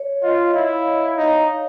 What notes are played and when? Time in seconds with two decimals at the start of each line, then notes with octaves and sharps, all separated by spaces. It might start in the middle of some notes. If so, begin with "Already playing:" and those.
Already playing: C#5
0.22 F4 D#5
0.54 E4 F5
1.17 D#4